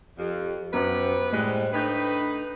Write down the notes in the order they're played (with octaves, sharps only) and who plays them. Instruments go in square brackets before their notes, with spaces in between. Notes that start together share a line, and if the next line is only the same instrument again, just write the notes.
[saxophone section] F2 [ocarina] G4
[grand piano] F#2 [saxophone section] B3 G4 B4 [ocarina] C5
[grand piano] A2 F#6 [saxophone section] G3 G#3
[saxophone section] A2 D#4 B4 [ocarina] D4 [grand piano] G5 G6